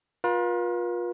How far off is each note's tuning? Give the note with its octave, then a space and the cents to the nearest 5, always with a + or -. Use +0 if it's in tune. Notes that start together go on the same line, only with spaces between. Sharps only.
F4 +25 B4 -45